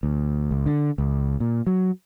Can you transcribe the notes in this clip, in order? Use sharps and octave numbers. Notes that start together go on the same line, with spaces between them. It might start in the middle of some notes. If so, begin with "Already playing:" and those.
D2
C#2
D3
C#2
A#2
F#3